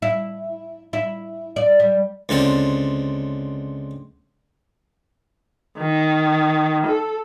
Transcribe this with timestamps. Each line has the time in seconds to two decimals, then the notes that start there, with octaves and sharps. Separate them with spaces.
0.02 E4
0.93 E4
1.56 D5
1.80 G3
2.29 C#2 D3 C4 D5
5.78 D#3
6.86 A4